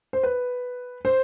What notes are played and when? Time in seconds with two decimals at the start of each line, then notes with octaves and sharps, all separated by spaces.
0.13 C5
0.23 B4
1.05 C5